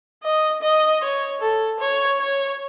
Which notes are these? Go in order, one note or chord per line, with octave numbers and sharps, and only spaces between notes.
D#5
D#5
C#5
A4
C#5
C#5